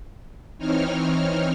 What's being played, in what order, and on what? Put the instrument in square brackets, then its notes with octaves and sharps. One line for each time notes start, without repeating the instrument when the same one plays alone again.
[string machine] E3 C4 D#4 C#5 F6